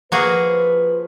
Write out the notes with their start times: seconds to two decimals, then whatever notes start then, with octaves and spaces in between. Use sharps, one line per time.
0.12 F3 A#3 F#4 G#4 B4